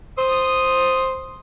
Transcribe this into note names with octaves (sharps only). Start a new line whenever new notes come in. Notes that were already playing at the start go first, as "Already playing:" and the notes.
C5 D#6